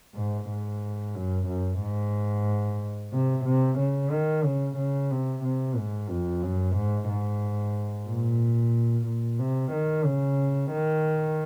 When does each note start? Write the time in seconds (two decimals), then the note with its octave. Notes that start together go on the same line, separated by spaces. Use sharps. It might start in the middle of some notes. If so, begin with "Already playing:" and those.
0.16 G#2
0.49 G#2
1.15 F#2
1.47 F#2
1.81 G#2
3.13 C3
3.45 C3
3.78 C#3
4.11 D#3
4.44 C#3
4.77 C#3
5.11 C3
5.43 C3
5.76 G#2
6.09 F2
6.42 F#2
6.76 G#2
7.08 G#2
8.07 A#2
9.06 A#2
9.39 C3
9.72 D#3
10.04 C#3
10.71 D#3